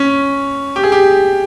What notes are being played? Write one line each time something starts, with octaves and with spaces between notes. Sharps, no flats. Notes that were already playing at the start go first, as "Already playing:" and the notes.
Already playing: C#4
G4
G#4
G4